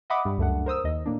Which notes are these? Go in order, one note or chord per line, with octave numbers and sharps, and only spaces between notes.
D#5 E5 F#5 B5 D6 D#6
G2 G3
C#2 F#2 A3 D4 F#5
A#4 C5 D#6 E6
D#2 D#5
A2 A#3 D4